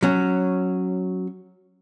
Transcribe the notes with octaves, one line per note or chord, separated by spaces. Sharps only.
F#3 C#4